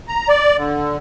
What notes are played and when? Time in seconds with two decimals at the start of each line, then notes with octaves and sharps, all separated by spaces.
0.08 A#5
0.28 D5
0.58 D3